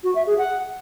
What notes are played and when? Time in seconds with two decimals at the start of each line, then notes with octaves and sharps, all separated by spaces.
0.04 F#4
0.15 E5
0.27 G#4
0.38 F#5